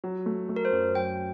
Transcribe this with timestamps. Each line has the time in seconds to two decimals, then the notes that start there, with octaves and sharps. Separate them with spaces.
0.04 F#3
0.26 A3
0.49 A3
0.56 A#4
0.65 C5
0.72 F#2
0.95 F#3 G5